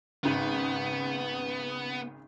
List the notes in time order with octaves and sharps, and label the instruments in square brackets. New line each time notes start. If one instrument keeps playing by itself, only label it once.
[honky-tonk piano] G#1 C#3 [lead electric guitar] B3